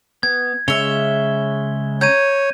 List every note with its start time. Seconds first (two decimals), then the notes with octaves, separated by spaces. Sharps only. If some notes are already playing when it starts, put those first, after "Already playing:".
0.23 B3 G#6
0.68 C#3 G#3 C#4 C#5 E5 G7
2.01 C#5 A#5 G6 G#6 D#7